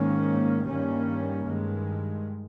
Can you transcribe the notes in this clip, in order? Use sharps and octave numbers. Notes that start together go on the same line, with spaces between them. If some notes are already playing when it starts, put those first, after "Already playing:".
Already playing: G#2 D#3 A#3 C#4
G2 D#3 G3 A#3 C#4
G2 D#3 G#3